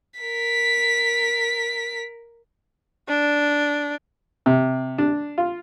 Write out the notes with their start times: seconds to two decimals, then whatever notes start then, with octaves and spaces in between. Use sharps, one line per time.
0.20 A#4 B6
3.08 D4
4.46 C3
4.98 D4
5.38 F4